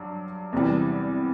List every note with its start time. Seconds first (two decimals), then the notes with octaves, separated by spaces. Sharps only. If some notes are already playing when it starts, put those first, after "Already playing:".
Already playing: G2 F#3
0.53 E2 C3 E3 G3